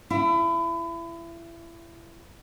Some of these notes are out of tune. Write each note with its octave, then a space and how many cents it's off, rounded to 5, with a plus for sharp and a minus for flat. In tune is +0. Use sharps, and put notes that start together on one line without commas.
E4 +30